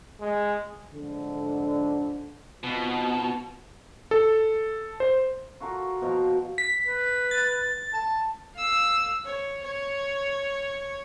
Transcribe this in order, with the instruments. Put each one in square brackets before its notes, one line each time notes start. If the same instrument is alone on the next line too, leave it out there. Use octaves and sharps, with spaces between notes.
[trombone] G#3
[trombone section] F2 G#2 D3
[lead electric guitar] B2 [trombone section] C4 D#4 F4
[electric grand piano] A4
C5
[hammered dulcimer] F4 F#4 A4 A#4
B2 F3 F#4 A#5
[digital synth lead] B6
[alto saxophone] B4
[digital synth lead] A6
[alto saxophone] A5
[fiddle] F5 E6
C#5
C#5